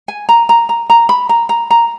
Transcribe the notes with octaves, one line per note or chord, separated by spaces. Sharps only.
G#5
A#5
A#5
A#5
A#5
B5
A#5
A#5
A#5